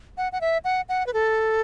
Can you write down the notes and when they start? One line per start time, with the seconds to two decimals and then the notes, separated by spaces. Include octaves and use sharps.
0.17 F#5
0.32 F#5
0.41 E5
0.65 F#5
0.89 F#5
1.07 B4
1.14 A4